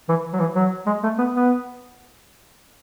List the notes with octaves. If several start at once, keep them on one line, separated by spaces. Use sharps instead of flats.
E3
F#3
E3
F#3
G#3
A3
B3
B3